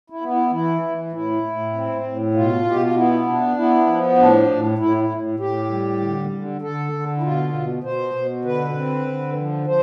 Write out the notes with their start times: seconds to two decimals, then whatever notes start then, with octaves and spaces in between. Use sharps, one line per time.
0.10 E4
0.21 B3
0.31 E4
0.51 E3 E4
0.82 E3
1.12 A2 E4
1.43 A2
1.73 C4
2.04 A2
2.34 B2 F4
2.64 B2 G4
2.82 F4
2.95 B3 E4
3.26 D4
3.56 B3 E4
3.87 F3
4.17 A2 D4
4.48 A2
4.78 A2 E4
4.99 E4
5.09 A2
5.39 A2 G4
5.70 G3
6.00 D3
6.31 D3
6.61 D3 A4
6.92 D3
7.18 E4
7.23 B2 F4
7.53 B2
7.84 B2 C5
8.14 B2
8.45 D3 B4
8.75 C4
9.06 D3
9.36 F3
9.66 F3 C5